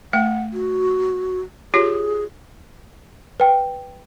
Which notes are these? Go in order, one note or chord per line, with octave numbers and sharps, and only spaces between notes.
A3 F#5 G5
F#4
F4 G4 G#4 C#5
B4 G5